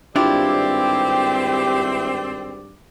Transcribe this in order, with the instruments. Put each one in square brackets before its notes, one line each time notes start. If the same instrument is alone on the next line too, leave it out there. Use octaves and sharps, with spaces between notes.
[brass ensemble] G#1 G2 D5 [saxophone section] C4 [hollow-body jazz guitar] D4 E4 F4 [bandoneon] G4